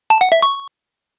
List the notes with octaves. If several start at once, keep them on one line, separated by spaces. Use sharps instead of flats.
A5
F#5
E5
C#6